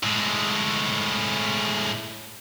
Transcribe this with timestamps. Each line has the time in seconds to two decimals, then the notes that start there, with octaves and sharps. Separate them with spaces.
0.03 A2 G#3